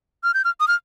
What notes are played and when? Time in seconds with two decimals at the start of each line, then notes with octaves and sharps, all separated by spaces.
0.24 F6
0.34 G6
0.45 F6
0.60 D#6
0.68 F6